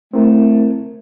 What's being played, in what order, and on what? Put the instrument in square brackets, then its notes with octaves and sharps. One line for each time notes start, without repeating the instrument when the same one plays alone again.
[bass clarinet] A3 [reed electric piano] C4 E4 A#4